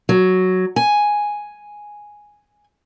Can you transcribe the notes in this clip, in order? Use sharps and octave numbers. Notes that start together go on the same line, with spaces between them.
F#3
G#5